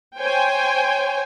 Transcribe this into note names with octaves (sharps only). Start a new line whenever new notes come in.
C5 C#5 G5 G#5